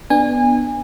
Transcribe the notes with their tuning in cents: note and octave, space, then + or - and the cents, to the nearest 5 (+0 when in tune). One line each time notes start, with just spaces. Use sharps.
B3 +0 D4 +15 G#5 -25